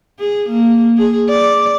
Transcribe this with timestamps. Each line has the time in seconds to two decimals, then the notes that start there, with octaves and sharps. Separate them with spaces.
0.20 G#4
0.50 A#3
0.97 G#4
1.29 D5